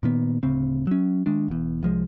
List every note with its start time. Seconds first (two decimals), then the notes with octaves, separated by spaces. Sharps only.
0.03 A#2 D#3 B3
0.43 D1 D2 C#3 C4
0.87 F#3 C#4
1.26 D#3 G#3 D4
1.48 E1 E2
1.83 C2 F3 G#3